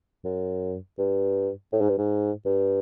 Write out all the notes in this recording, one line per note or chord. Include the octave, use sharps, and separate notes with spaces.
F#2
G2
A2
G#2
G2
G#2
G2